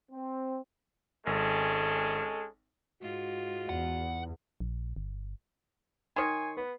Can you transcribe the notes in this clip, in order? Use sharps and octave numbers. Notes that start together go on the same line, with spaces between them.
C4
G#1 G#3 C#4 A4
G#2 G#3 F4 F#4
E2 F#5
A#1
G1
D#3 C#5 G#5 C6 D#6 C7
B3 B4